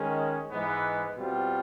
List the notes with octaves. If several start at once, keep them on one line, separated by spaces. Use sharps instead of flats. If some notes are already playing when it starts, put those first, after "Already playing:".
Already playing: D#3 G#3 C#4
G#2 E3 G#3 B3
B2 G3 C4 F4